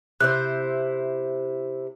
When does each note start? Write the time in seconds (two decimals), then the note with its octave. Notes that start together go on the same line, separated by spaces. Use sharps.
0.21 C3 E4 C5 F#6